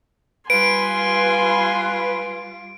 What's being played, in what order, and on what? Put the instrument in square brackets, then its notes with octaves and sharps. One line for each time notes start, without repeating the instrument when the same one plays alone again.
[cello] G3 F4 [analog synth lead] B4 [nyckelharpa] G#5 C6 [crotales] D7